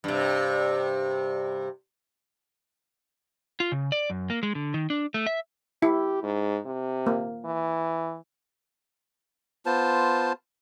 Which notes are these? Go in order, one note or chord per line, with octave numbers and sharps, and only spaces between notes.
G2 C3
F4
C#3
D5
F#2
A#3
G#3
D3
D#3
D4
A3
E5
E4 G4
G#2
C3
A#3
E3
B3 F4 C5 A5